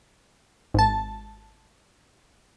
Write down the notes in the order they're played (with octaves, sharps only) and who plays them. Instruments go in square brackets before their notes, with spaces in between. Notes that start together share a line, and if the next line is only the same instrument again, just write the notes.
[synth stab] G#1 A5